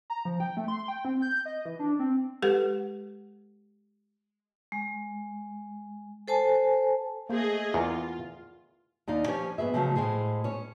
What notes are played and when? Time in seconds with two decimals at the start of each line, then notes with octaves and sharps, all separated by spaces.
0.10 A#5
0.25 F3
0.40 G5
0.57 A3
0.68 C6
0.88 G5
1.05 C4
1.22 G6
1.45 D#5
1.65 E3
1.79 D4
1.99 C4
2.42 G#3 G4 A4 B4 F#5
4.72 G#3
6.28 A4 C5 G#5 A5
7.29 A3 A#3 G#4 C5 D#5
7.74 E2 F4 A#4
9.07 D#2 D#4 D5 F5
9.27 F3 C#4 G4 C#5
9.58 G#2 B3 G#4 E5
9.74 C#3 F3 F#3 G#3 A3
9.96 A2 G#3 G#4 C5
10.44 C#4 C#5